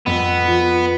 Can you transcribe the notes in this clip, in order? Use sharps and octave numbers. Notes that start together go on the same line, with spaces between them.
F2 B3
F3